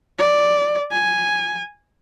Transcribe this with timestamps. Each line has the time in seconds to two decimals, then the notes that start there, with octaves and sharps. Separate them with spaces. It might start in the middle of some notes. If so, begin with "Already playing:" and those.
0.19 D5
0.92 G#5